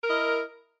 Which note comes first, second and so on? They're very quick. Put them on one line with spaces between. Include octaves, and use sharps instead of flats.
A#4 E4 D#5